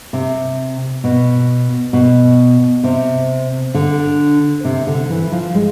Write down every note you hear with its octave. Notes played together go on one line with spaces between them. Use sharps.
C3
B2
B2
C3
D3
C3
D3
E3
F3
G#3